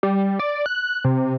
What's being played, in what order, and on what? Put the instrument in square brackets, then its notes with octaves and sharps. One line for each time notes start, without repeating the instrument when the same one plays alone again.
[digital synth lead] G3
D5
F#6
C3